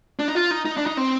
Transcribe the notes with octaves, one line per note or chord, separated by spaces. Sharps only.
D4
D#4
F4
D#4
D#4
D4
D#4
C4